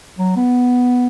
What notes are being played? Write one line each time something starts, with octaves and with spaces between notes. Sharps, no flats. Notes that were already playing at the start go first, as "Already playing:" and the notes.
F#3
B3